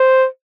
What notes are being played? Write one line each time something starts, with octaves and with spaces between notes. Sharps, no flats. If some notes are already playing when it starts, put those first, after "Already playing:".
Already playing: C5